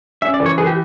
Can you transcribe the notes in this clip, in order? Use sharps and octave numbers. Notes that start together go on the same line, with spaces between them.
C#4 E5
D5
E3
C#5
E3 G#4
G4